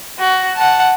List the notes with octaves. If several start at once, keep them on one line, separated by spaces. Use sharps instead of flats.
F#4
F#5 A5